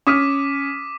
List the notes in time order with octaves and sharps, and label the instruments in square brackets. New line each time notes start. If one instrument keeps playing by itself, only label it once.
[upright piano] C#4 D#6 F6 [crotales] D6 B6 D#7